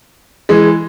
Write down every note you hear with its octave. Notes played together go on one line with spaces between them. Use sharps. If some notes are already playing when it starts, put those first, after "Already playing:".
E3 G#3